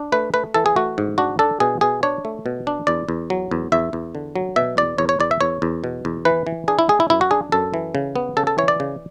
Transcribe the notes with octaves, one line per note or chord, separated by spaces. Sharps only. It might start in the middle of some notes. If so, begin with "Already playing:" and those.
Already playing: D4
A3 B4
A3 B4
E3 A4
G#4
A3 F#4
G#2
D4 F#4
D4 A4
B2 G#4
B2 G#4
D4 C#5
A3
B2
D4
E2 D5
E2
F#3
E2
E2 E5
E2
D3
F#3
B2 E5
E2 D5
E2 C#5
C#5
E2 D5
E5
E2 C#5
E2
B2
E2
E3 B4
E3
D4 G#4
E4
G#3 G#4
E4
F#2 E4
F#4
D4 G#4
F#2 A4
E3
C#3
B3
C#3 A4
A4
E3 C#5
D5
C#3